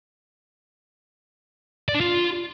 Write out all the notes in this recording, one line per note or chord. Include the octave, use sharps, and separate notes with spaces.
D5
D4
F4